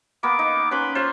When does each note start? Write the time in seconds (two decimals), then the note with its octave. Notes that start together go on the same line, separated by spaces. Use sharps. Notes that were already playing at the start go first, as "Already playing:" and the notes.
0.23 A#3 B3 D6
0.39 D#4
0.71 C#4 B4 C6 D6
0.95 F4 C5 C#5 C6